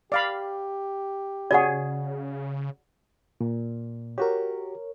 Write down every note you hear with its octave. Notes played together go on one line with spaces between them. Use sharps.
G4 D5 F5 B5
C#3 F#4 G#4 C#5 D5 F#5
A#2
F#4 G4 A#4 C#5